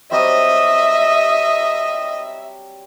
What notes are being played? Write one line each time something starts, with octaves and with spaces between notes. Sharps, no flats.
F#3 G3 C4 D#5 E5